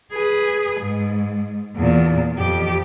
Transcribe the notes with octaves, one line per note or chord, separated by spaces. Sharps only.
G#4 B4
G#2
E2 A#2
F2 G4